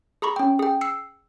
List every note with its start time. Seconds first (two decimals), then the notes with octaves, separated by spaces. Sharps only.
0.22 G#4 A#5 B5 C#6
0.36 C#4 G5
0.59 G#4 G5
0.81 E6 C7 C#7